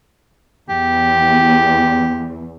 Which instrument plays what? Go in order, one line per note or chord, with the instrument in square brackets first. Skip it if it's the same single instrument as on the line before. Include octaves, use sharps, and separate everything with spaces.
[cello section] E2 [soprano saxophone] G4